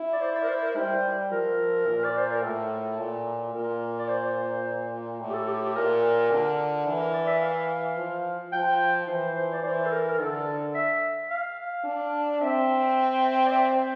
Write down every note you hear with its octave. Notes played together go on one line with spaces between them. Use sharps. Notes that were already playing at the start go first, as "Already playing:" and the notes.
Already playing: E4
D5
C5
D5
A#4
C5
A#4
G3 C5
F3 A#4
A#2
D5
C5
A#4
A2 A4
A#2
A#2 A#4
D5
C5
A2
G4
A4
G4
G4
A#2 A#4
D3
E3
A#4
D5
E5
F5
F3
F3 G5
E3 C5
C5
D5
E3 C5
A4
A#4
A#4
D3 A4
E5
F5
D4
C4 E5
D5
E5
C5